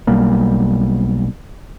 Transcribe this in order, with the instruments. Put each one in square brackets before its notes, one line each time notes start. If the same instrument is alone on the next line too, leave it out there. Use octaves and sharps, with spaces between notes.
[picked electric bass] B1 G3 A#3